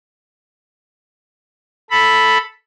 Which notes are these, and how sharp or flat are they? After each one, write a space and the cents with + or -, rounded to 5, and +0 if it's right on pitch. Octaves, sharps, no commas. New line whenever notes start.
A4 +0 B5 +0